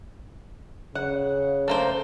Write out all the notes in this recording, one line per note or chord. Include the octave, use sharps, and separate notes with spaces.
C#3 F#5
A3 A#3 C5